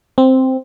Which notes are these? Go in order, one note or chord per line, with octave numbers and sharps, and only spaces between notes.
C4